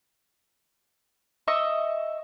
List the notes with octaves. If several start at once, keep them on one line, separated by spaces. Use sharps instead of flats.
D#5 E5 C#6 D#6